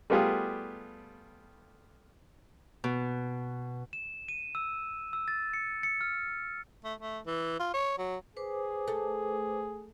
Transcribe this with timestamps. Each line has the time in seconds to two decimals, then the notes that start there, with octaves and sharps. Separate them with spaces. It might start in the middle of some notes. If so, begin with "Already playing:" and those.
0.10 G3 A3 B3 F4 G4 G#4
2.84 B2
3.93 E7
4.28 D#7
4.55 E6
5.13 E6
5.28 A6
5.53 C#7
5.83 C#7
6.01 F6
6.84 A3
7.00 A3
7.26 E3
7.59 F4
7.74 C#5
7.98 F#3
8.37 G#4 B4 C5 D6
8.88 A3